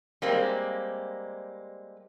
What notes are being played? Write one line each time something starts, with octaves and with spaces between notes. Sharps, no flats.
G3 G#3 A#3 C4